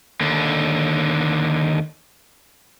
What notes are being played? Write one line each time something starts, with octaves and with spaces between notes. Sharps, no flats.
D#2 D3